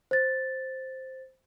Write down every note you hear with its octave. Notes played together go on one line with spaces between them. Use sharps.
C5 A6